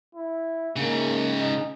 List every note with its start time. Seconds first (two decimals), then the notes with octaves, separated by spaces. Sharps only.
0.15 E4
0.76 G#2 C#3 A#3
1.40 D#4